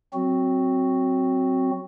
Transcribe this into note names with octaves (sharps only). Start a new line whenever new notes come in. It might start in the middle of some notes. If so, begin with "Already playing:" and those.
F#3 C4 F#4